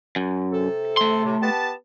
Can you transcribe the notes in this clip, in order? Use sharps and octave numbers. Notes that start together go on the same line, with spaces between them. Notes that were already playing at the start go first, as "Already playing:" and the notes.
F#2
C3 A4
A3 C6
A2 C3
B3 G4 A5